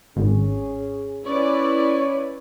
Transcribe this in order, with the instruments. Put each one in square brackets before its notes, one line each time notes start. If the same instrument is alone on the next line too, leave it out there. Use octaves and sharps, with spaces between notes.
[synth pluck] G#1 [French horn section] C#4 G#4
[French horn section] C#4 [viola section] E4 B4 D5 [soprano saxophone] C#5